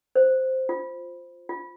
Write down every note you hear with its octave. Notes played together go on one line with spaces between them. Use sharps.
C5
F4
F4